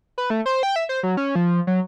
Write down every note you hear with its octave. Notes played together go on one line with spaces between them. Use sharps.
B4
A3
C5
G5
E5
C5
F#3
C#4
F3
F#3